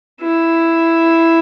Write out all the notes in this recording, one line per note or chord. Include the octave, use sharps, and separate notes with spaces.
E4